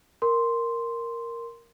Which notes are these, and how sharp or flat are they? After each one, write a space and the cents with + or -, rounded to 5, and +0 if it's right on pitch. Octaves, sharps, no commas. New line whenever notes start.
A#4 +0 C6 +0